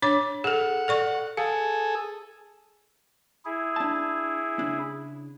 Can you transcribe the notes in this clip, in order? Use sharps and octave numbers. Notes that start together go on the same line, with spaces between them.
D4 C#5 D6
G#4 A4 F#5
A4 D5 C#6
G#4 A4 F5
E4 G#4
D4 A5
C#3 D4